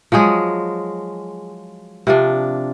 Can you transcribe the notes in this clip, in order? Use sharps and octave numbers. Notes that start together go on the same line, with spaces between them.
F3 F#3 G#3 G#4
C3 F3 D4